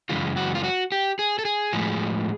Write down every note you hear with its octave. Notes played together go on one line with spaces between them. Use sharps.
F#2 C#3 E3 G#3 F4
F#4
F4
F#4
G4
G#4
A4
G#4
A2 F3 G#3